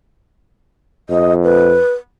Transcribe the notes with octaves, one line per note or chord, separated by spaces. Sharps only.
F2 D#5
B4